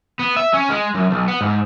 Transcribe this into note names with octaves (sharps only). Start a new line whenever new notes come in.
B3
E5
C#4
G#3
F#2
B1
B3
G#2